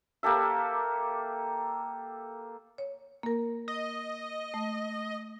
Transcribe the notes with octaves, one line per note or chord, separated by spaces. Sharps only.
A#3 G4 A4 E5
C#5
A#3 A#4
D#5
A3